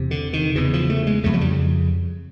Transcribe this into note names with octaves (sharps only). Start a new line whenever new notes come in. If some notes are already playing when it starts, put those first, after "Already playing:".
Already playing: E2 C3
D3
D#3
E2 C#3 E3
F3
A3
G#3
F2 C#3 A3
F#3
G3